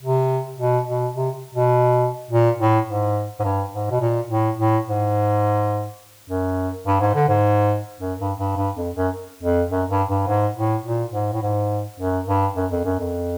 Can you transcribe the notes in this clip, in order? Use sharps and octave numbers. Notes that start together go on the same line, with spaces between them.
C3
B2
B2
C3
B2
A#2
A2
G#2
G#2
G2
G#2
B2
A#2
A2
A2
G#2
F#2
G2
G#2
D3
G#2
F#2
G2
G2
G2
F2
F#2
F2
F#2
G2
G2
G#2
A2
A#2
G#2
A2
G#2
F#2
G2
F#2
F2
F#2
F2